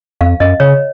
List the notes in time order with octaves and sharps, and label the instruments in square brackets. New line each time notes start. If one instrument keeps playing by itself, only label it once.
[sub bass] F2 [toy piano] F5
[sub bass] F#2 [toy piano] D#5
[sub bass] C#3 [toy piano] C#5